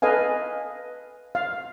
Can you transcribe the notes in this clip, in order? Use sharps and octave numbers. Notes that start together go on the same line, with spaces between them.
A4 B4 D#5 F5 G#5
F5